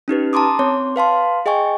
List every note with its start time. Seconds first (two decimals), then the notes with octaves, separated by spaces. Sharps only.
0.08 C#4 D#4 G4 B4
0.33 A5 A#5 C6 D6 D#6
0.59 C4 C#5 C6
0.96 B4 F5 A5 C6
1.46 G#4 D#5 G5 G#5 C#6